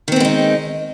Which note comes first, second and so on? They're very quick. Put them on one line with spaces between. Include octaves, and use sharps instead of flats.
D#3 C4 B3 G#3 D#4